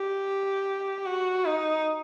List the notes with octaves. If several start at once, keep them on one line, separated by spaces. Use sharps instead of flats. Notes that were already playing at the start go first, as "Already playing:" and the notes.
Already playing: G4
F#4
D#4